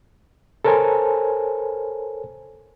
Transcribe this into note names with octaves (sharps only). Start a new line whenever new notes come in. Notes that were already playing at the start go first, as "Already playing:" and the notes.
A4 A#4 C5 C#5 G#5